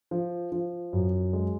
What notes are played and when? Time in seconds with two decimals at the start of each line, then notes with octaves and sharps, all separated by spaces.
0.11 F3
0.52 F3
0.93 F#2
1.33 G#3